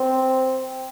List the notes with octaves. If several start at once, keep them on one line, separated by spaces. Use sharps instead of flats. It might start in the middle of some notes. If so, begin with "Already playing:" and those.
Already playing: C4